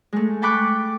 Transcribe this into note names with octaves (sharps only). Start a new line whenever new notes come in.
G#3 A3
G5 A5 B5 C#6 D6 F#6